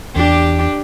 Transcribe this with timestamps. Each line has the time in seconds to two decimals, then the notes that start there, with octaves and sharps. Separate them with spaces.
0.16 E2 D4 G4